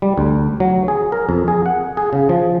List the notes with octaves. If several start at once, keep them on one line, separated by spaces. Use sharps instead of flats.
G3
D2
F#3
G#4
A#4
F2
G#4
F#5
G#4
C#3
F3